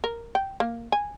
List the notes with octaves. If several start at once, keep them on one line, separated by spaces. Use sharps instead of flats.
A#4
G5
A#3
G#5